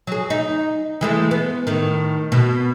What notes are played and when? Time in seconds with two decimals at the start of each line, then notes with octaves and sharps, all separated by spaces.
0.07 F#3 G#4
0.30 D#4
1.01 E3 G#3 A3
1.31 B3
1.67 A2 D#3
2.32 B2